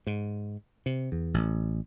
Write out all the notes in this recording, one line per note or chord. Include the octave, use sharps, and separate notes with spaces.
G#2
C3
E2
A1